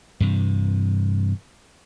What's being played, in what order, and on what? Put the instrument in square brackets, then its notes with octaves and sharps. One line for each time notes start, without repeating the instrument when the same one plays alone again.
[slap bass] G2 C3 E3